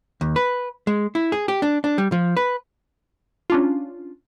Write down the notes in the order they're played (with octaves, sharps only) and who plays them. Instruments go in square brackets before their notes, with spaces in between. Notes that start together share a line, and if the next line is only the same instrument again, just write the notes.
[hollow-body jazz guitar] D#2
B4
G#3
E4
G#4
G4
D4
D4
G3
F3
B4
[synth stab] C#4 D4 F4